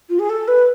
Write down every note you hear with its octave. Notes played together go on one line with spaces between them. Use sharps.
F4
G#4
A4
B4